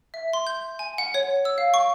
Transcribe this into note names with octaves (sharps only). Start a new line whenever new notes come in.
E5
C6
G6
G#5
F#5
C#5
E6
F5
C#6